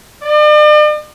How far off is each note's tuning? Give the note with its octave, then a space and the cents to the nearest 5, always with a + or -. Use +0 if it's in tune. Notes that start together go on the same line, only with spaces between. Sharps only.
D5 +45